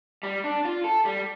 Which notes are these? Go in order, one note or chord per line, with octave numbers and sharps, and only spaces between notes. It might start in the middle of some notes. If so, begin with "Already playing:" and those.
G3
D4
F4
A4
G3